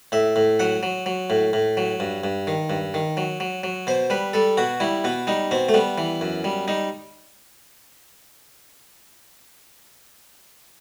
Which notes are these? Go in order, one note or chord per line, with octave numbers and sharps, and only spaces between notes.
A2 E5
A2
F#3 F#5
F#3
F#3
A2
A2
F#3
G2
G2
D#3
G2
D#3
F#3
F#3
F#3
B2 C5
G3 B4
G3 A4
B2 F#4
G3 E4
B2 B3
G3 D#4
B2 C4
A3
G3 B3
E3
F#2
G3
G3 D#4